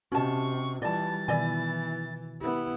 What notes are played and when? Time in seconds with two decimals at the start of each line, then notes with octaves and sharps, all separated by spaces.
0.12 C3 C#4 F#4 G4 D#5 A5 C#6
0.82 E3 G3 F4 D5 A5 A6
1.28 B2 D#3 E3 E4 D5 G#5
2.41 B3 E4 G4